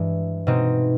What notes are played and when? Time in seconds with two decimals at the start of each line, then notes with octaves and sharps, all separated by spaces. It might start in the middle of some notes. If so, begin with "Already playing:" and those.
Already playing: G2 E3 G#3
0.47 B2 G#3 C4 D#4